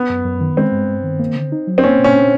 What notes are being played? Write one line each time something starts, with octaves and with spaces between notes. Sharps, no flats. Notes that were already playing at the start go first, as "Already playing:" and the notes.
Already playing: B3
F#2
F#2
D#3
G#3 C4
G2
G2
D#3
A#3
D3
D#4
F#3
C4
A#3 C#4
A#2
C#4
D4